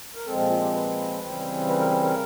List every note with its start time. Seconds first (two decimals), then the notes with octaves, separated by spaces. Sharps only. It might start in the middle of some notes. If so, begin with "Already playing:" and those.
0.16 A#4
0.26 A#2 F3 G#3 C4 A4
0.38 F4
0.50 F4
0.62 G4
0.74 B4
1.20 C#3 E3 G3 C4
1.68 B4
1.79 A#4
1.91 B4
2.03 A#4